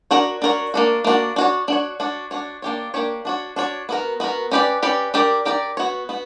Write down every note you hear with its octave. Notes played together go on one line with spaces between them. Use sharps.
D4 F#4 A#4 C#5
D4 F#4 A#4 C#5
A#3 D4 F#4
A#3 D4 F#4
D4 F#4 C#5
D4 F#4 C#5
D4 F#4 C#5
D4 F#4 C#5
A#3 D4 G4 C#5
A#3 D4 G4 C#5
D4 F#4 C#5
D4 F#4 C#5
B3 F#4 A#4
B3 F#4 A#4
C#4 G4 B4 D5
C#4 G4 B4 D5
D4 G4 A#4 D5
D4 G4 A#4 D5
B3 F#4 C#5
B3 F#4